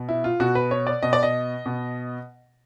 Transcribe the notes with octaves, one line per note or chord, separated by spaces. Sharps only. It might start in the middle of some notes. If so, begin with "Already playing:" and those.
Already playing: B2
E4
F4
B2 F#4
B4
C#5
D5
B2 D#5
D5
D#5
B2